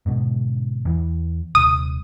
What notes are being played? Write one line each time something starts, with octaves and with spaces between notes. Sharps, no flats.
G#2 B2 D3
E2 E3
D#1 C2 D#6